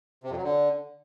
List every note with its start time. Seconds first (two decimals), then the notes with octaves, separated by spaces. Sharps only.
0.24 C3
0.30 F2
0.37 F#3
0.43 D3